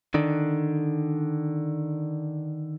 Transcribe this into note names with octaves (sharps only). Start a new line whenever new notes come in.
D3 D#3 D4